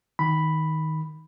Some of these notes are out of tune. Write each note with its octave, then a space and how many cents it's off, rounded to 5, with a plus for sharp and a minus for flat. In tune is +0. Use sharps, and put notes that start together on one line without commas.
D#3 +10 B5 +0